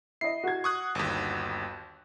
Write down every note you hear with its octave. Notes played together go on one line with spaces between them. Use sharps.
E4 D#5 C7
F#4 G#6
C#6 D#6 F#6
G1 D#2